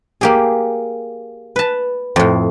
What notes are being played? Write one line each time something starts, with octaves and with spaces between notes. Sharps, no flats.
A#3 G4 G#4
B4 A5
F2 A2